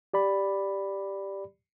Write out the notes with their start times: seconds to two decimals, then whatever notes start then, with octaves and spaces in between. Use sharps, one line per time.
0.14 G4 D5 B5